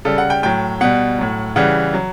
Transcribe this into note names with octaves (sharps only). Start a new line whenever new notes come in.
C#3 G3 A4
F#5
G5
A2 F#3 G5
B2 G3 F#5
A2 F#3
C#3 E3 G3 F#5
F#3